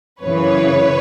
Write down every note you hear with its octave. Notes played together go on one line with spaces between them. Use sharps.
F#2 C#3 E3 B4 C#5